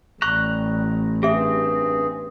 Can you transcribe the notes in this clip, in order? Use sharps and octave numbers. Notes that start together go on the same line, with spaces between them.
A1 G3 A#5 C#6 F#6
G2 C4 G4 G#4 E5